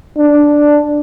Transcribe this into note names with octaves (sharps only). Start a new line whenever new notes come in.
D4